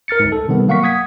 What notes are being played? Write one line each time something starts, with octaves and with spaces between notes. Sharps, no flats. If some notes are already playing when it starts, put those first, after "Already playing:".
A#4 F6 A6 C#7
C#2 G#2
A4
C3 D#3 G3 B3
F#3 A#3 F5 F#5 C#6 B6
F#5 D#6 G#6 B6